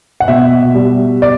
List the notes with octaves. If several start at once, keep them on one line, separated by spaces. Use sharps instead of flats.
F#5
B2 E5
G3
D5